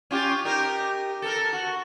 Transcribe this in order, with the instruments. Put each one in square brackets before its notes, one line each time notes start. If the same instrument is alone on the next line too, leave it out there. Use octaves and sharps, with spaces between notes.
[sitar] C#4 F4 G4
D#4 G4 A#4
A4 A#4
F#4